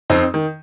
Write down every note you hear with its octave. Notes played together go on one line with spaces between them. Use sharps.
F2 C4 D#4
D#3